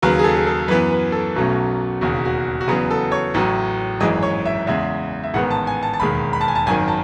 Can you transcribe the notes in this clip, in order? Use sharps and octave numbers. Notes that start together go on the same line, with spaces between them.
D#2 C#3 F#3 B4
G#4
A4
G#4
A4
F#2 E3 B3 B4
B4
A4
B1 B2 F#3 A3 C#4
E1 D#2 C#3 F#4
F#4
F#4
E2 C#3 F#3 B3 G#4
A4
C#5
A1 A2 F#3
G#1 F#2 E3 G#3 D#5
C#5
E5
E2 C#3 G#3 E5
E5
A1 G#2 D#3 G#3 B3 F#5
A5
G#5
A5
A5
E1 D#2 D#3 G#3 B5
B5
A5
G#5
A5
G#1 F#2 D#3 G#5
A5